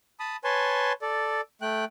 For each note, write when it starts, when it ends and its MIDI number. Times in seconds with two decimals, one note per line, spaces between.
0.20 0.36 81
0.20 0.36 83
0.20 0.36 87
0.44 0.92 71
0.44 0.92 73
0.44 0.92 80
0.44 0.92 81
0.44 0.92 84
1.02 1.41 69
1.02 1.41 74
1.62 1.85 57
1.62 1.85 79
1.62 1.85 90